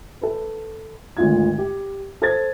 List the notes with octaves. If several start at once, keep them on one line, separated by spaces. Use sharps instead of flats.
A4 B4
G#1 D2 F4 G#6
G4
A4 C5 G#6 A6